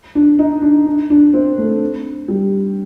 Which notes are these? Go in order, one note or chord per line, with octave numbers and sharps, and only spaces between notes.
D4
D#4
D4
D4
D4
C4
A3
G3